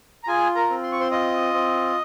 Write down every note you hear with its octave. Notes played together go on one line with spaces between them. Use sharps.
A#5
F4 G#4 G#5
A#4 A#5
C4
C6
C#6
C5 C6
F4 D#5 D#6
C4